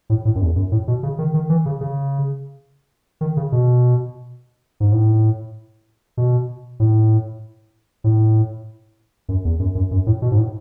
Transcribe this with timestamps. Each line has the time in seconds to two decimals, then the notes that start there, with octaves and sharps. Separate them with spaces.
0.10 A2
0.25 A2
0.35 F#2
0.41 E2
0.56 F#2
0.72 A2
0.88 B2
1.03 C#3
1.19 D#3
1.34 D#3
1.50 E3
1.66 C#3
1.81 C#3
3.21 D#3
3.37 C#3
3.52 B2
4.80 G#2
4.92 A2
6.17 B2
6.80 A2
8.04 A2
9.29 F#2
9.45 E2
9.60 F#2
9.75 F#2
9.91 F#2
10.06 A2
10.22 B2
10.31 G#2
10.37 A2